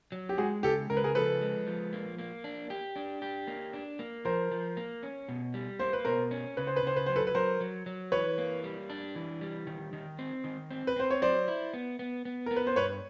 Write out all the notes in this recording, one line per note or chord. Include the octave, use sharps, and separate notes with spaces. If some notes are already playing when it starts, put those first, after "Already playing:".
F#3
G4
G#3 F#4 G#4
C#3 G4 A4
C#3 A#4
B4
G#4 A#4
F3 A4 B4
G#3
F3
A#3
A#3
D4
G4
D4
G4
A#3
D4
A#3
F3 A#4 C5
F3
A#3
C#4
B2
G3
A#3 C5
B4
B2 A#4 C5
C#4
C#3 B4
C5
B4
C#3 C5
B4
F#3 C5
A4 B4
B4
F#3 A#4 C5
F#3
F#3
E3 B4 C#5
A#3
G3
D4
E3
G3
D#3
D#3
C4
D#3
C4
B4
C4 C5
C#5
F#3 C5 D5
E4
B3
B3
B3
B3 A#4
B4
C5
G2 B4 C#5